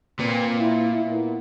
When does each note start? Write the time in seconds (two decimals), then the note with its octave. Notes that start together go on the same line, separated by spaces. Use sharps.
0.20 A#2 C4 B4
0.59 E4
1.06 A#2 B3